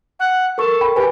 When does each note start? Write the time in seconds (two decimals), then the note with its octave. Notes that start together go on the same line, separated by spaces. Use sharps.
0.20 F#5
0.58 A4 A#4 C#6
0.81 G5 B5
0.96 G4 B4 G#5